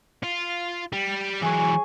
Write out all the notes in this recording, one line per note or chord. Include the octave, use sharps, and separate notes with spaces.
F4
G3
E3 F#3 G#4 C#6